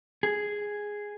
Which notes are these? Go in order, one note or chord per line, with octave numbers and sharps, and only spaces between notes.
G#4